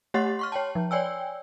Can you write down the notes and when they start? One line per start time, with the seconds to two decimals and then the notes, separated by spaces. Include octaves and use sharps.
0.14 A3 G4 C#5 F#5 C6 A6
0.39 C6 C#6 F6
0.52 C#5 G5 A5
0.75 F3
0.91 C#5 D5 G5 G#5 E6